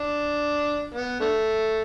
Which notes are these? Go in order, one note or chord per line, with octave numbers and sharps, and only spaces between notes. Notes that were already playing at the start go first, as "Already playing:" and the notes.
Already playing: D4
B3
D3 A3